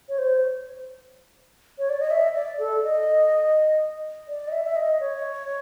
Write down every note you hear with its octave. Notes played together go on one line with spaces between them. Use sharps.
C#5
C5
C#5
D5
D#5
E5
D5
A4
D#5
D5
D#5
E5
E5
D#5
C#5